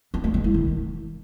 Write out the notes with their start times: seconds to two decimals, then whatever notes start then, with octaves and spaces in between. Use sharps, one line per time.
0.14 D4
0.24 A3
0.34 G#3
0.44 E4
0.54 D#3